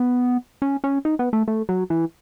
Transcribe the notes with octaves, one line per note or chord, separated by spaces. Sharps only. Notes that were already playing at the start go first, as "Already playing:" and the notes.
Already playing: B3
C#4
C#4
D#4
B3
A3
A3
F#3
E3